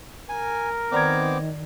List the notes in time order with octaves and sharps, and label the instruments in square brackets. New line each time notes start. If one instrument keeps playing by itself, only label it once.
[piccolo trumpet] A#4 [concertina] G#5
[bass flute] D#3 [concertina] B3 C4 D6 [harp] D5 A#5 G#6